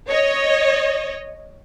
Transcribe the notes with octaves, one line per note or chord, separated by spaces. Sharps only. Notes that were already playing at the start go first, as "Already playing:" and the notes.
C#5 D#5